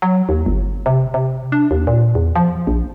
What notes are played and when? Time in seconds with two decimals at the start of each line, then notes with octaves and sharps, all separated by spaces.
0.02 F#3
0.29 D#2
0.46 G1
0.86 C3
1.14 C3
1.52 D4
1.71 D#2
1.87 A#2
2.15 E2
2.36 F3
2.67 A#1